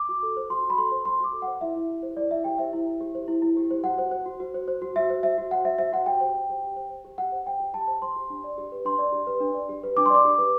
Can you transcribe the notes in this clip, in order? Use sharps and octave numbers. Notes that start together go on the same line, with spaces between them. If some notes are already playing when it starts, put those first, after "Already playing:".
Already playing: D6
F#4
A4
C5
F#4 C6
F#4
B5
A4 C6
C5
F#4 C6
F#4 D6
A4
C5 F#5
E4 E5
E4
G4
C5
E4 D5
E4 E5
G4 G5
C5 E5
E4
E4
G4
C5
E4
E4
G4
C5
F#4 F#5
C5
C5
F#4
F#4
C5
C5
F#4
F#4 E5
C5
C5 E5
F#4
F#4 F#5
C5 E5
C5 E5
F#4 F#5
G4 G5
C5
C5
G4
G4
C5
C5
G4
G4 F#5
C5
C5 G5
G4
G4 A5
C5
C5 C6
G4
D4
D5
G4
B4
D4 C6
D5
G4
B4
D4
D5
G4
B4
D4 D6
C6
D5 D6
G4
B4